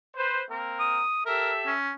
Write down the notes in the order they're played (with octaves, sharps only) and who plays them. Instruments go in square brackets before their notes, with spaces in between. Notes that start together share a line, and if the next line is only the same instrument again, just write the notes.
[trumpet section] B4 C5
A#3 C4 A#4
[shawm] D#6
[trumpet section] G4 A4 E5 [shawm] A#4
[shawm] C#4